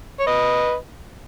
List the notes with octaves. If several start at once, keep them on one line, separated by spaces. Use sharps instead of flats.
C#5
B4 D#5